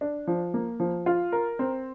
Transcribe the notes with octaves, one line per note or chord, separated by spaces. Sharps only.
D4
F3
A#3
F3
F4
A#4
C4